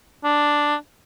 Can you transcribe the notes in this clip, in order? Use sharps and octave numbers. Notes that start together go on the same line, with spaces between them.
D4